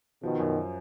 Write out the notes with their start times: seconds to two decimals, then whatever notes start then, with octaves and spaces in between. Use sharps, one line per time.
0.22 B2 D#3 F3
0.40 F#2